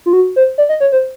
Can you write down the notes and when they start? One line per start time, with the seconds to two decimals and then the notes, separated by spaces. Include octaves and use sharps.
0.06 F4
0.13 F#4
0.36 C5
0.58 D5
0.69 D#5
0.80 C#5
0.92 C5